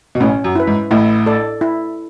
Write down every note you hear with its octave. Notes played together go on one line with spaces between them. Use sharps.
B2
A1 A2 C#4
F#2
E4 B4
G#2
A1 A2 E4
A4 D5
E4